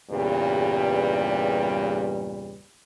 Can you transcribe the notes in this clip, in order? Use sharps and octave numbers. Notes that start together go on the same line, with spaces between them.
E2 G2 A#2 C#3 G3